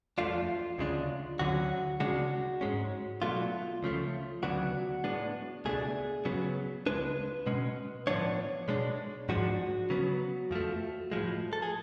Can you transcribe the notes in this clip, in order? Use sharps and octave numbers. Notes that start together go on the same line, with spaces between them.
F2 F3 A3 D4 F4
D2 C#3 G#3 D4
D2 D3 F#3 C#4 F#4
C#2 C#3 G#3 D4 F#4
G#2 G#3 C#4
B2 F#3 A3 D4 F4
C#2 C#3 F3 A3
D2 C#3 F#3 B3 D4 F#4
A2 G#3 B3 D4
C#2 B2 A3 D4 G#4
C#3 F#3 B3
C#2 B2 G#3 D4 B4
B2 G#3 C#4
A2 F3 B3 D4 C#5
B2 G#3 D4
G#2 F3 G#3 D4 F#4
C#3 F#3 B3
F2 F3 A3
A2 F3 G#3
A4
G#4